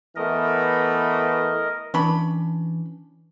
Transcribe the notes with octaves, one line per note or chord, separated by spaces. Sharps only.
E3 A3 B3 A#4 D#5
E3 C#4 D4 B5